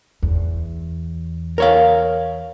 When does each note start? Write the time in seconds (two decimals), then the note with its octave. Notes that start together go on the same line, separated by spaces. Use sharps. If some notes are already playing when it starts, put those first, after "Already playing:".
0.22 E2
1.58 A#4 C#5 F5